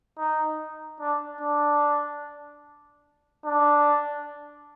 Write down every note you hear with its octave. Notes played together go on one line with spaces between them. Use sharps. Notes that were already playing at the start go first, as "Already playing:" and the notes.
D#4
D4
D4
D4